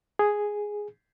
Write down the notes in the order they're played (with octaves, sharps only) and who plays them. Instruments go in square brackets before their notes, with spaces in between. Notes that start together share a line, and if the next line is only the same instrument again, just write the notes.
[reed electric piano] G#4